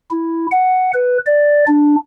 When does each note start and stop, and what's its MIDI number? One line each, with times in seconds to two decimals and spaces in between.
0.11 0.47 64
0.51 0.91 78
0.94 1.18 71
1.26 1.65 74
1.67 1.96 62